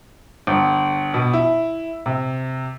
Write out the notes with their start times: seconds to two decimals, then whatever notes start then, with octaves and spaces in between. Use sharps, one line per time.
0.47 G1
1.14 B2
1.33 E4
2.06 C3